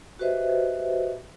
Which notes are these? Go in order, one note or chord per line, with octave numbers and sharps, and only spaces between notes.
F#4 G4 B4 C5 D#5 E5